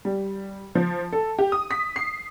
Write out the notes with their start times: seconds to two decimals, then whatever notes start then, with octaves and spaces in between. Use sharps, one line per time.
0.05 G3
0.75 F3
1.13 A4
1.39 G4
1.52 D#6
1.71 B6
1.96 C7